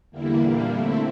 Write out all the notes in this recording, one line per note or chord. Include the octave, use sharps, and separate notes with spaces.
E2 D3 G3 A#3 E4
A#2 G3 A#3 D4
D3 A3 C4 E4